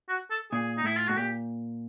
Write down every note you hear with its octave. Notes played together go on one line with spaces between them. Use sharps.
F#4
A4
A#2 G#4
D#4
A2 E4
F4
A2 F#4
A#2 G4